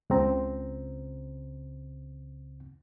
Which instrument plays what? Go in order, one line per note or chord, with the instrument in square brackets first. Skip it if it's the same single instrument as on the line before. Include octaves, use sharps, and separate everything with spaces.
[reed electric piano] C#2 C#3 C4 A#5